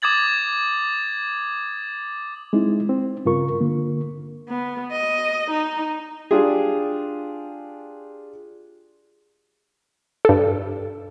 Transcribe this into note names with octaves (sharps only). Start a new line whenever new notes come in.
D6 D#6 G#6 A6 F#7
G#3 C4 D#4 E4
C4
G2 C#3 F4 A#4 C#6
D3 A#3
B3
D#5
D#4
D4 F4 G4 G#4
G2 A4